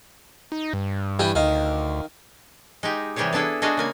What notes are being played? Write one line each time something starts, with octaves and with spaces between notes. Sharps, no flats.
D#4
G2
E3 G3 G4
D2 D#3 F5
G#3 D#4 G4
C3 E3 G3 G4 G#4 C#5
B3 D4 E4 G#4 A4
G#3 D4 F#4 G#4 D#5 F5
C#3 A#3 G#5